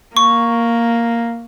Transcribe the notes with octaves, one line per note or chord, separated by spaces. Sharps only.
A#3 C#6